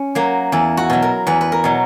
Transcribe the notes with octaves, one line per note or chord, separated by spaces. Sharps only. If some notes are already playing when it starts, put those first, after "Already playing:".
Already playing: C#4
F#3 A#3
E2 E4
F#4
B2 F#3
A#4
E2 B4
B4
A#4
B2 F#3